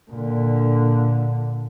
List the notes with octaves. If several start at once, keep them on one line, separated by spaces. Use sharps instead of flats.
A#2 D3